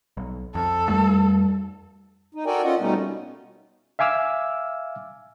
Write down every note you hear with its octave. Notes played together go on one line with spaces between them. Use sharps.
B1
F2 A4
F2 G3 A3
D#4
F#4 A4 A#4 D5 G5 G#5
C#4 F4 D#5 F#5
B2 G3 A3 B3 C#4 D#4
E5 F5 G#5 D6 E6 F6